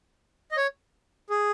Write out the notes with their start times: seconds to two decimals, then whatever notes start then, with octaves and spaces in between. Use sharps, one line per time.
0.51 D#5
0.57 C#5
1.30 G#4